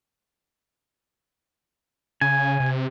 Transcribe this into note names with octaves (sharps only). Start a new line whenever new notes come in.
C#3 G#5
C3